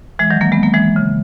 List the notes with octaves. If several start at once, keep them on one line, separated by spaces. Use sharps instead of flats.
E3 G#3
D#3 F#3
F#3 A#3
G#3 B3
F#3 A#3
E3 G#3
C#3